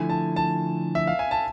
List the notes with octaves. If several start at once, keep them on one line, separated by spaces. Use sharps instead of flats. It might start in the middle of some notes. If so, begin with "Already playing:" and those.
Already playing: D3 F3 A3 E4 G#5
A5
A5
E5
F5
G#5
A5